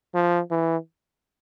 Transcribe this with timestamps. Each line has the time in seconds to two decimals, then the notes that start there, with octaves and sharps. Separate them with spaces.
0.14 F3
0.51 E3